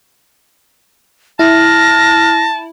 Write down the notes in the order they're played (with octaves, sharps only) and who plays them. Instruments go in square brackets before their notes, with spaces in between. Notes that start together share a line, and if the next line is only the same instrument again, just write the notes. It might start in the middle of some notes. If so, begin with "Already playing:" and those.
[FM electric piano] E4 [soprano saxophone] A5 [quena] F6 [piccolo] A#6